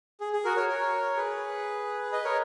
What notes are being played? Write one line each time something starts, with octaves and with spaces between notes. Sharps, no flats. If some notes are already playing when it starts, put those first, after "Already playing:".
G#4
G#4
F#4 A#4
A#4 C#5
A#4 C#5
G#4 B4
B4 D#5
A#4 C#5